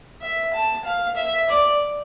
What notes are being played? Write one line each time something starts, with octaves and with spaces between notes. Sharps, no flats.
E5
A5
F5
E5
D5